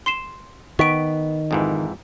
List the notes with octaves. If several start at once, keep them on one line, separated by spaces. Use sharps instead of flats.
C6 C7 E7
D#3 B3 C#6 B6 D7
F2 G#2 E3